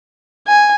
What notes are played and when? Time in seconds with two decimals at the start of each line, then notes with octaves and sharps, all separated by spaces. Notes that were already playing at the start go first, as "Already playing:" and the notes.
0.47 G#5